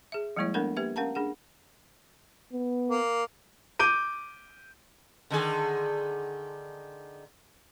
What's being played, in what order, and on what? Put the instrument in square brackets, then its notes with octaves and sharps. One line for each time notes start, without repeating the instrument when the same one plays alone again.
[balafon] G#4 E5
F3 G3 G#3 A#3 E4 C#5
A3 B3 D4 A4 A#4 F#5
A#3 G4 B4 E5
C#4 A#4 F5 F#5 A5 A#5
D4 G#4 F#5
[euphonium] B3
[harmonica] A#3
[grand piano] D6 G6 D7 D#7
[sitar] D3 D#3 G#4